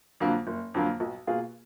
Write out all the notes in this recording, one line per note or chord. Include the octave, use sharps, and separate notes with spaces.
F2 D3 F#3 A#3
F#1
F2 D3 F#3 A#3
B1
B2 A#3 F4 G#4